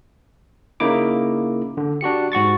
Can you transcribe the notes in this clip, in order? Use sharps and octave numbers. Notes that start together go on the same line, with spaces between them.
C#3 A#3 D#4 E4 D6
D3
D4 F#4 G4 C#7
G#2 F#4 C#6 A6